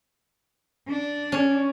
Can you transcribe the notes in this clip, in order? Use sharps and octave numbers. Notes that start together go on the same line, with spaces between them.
D4
C#4